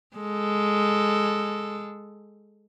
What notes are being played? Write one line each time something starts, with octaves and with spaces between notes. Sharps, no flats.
G#3 A4